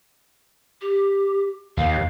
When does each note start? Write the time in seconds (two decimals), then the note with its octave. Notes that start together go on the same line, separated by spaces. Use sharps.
0.81 G4
1.77 D#2 F5